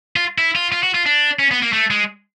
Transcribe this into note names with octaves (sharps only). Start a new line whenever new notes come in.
F4
E4
F4
F4
F#4
F4
D4
C#4
B3
A#3
A3
G#3